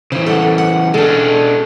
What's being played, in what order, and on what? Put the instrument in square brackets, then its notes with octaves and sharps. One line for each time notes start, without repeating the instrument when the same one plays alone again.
[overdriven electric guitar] C#3 E3 [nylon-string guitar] C5
[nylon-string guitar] A4 C5 F#5
F#5
[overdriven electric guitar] G#3 D4 [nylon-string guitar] C#4 A4